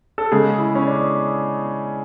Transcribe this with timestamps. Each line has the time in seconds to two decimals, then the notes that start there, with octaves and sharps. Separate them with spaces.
0.18 A4
0.32 C#3 G#3 G#4
0.58 E4
0.75 C#4
0.87 D4